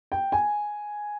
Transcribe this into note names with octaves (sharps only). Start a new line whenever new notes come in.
G5
G#5